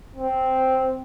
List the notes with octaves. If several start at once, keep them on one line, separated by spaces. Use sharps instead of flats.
C4